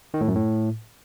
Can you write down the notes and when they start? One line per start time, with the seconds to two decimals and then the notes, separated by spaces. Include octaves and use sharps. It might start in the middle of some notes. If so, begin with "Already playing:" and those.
0.14 D#3
0.21 A2
0.28 F#2
0.35 A2